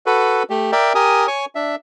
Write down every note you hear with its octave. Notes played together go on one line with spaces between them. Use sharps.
F#4 A4 B4
A3 G4
A#4 D5 E5 G5
G4 A#4 G#5 D#6
C#5 G#5 C#6
D4 E5